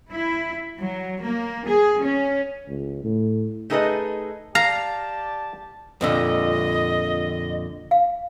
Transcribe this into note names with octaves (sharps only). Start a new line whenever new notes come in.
E4
F#3
A#3
G#4
C#4
C#2
A2
A3 D#4 G#4 A4 B4 D#5
G4 D5 F5 A5 A#5
F2 A#2 D3 D#5
F5